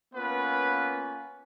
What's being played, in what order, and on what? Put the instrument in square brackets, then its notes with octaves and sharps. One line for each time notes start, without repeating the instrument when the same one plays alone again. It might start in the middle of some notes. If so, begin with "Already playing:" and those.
[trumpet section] A#3 B3 C#4 F4 B4